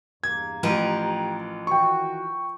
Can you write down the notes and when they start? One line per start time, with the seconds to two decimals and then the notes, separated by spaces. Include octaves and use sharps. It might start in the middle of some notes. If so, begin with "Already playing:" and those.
0.24 E2 G2 A#3 G#6
0.63 A1 F3 G4 A#4 B4 G5 A#5
1.67 D#3 E3 F#4 G5 C#6